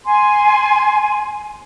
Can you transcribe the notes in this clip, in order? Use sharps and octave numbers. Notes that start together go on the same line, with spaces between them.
G#5 C6